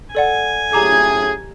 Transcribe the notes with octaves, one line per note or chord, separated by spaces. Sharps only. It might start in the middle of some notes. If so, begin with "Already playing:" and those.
A4 D5 F#5 G#5
F#2 A2 G4 G#4 A#5 D6 G#6